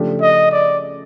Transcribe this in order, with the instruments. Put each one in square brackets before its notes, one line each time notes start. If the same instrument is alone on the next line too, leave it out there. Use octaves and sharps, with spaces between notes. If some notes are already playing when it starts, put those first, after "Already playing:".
Already playing: [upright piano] C#3 F3 A3 D4 G4
[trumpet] D#5
D5